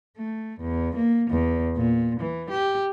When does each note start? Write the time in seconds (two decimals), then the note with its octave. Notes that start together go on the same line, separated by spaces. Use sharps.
0.17 A3
0.60 E2
0.96 A#3
1.31 E2
1.77 A#2
2.20 E3
2.50 G4